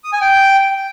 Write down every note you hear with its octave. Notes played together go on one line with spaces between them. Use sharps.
D#6
G#5
G5